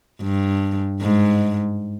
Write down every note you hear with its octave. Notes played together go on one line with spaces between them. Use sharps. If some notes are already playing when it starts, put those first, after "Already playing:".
G2
G#2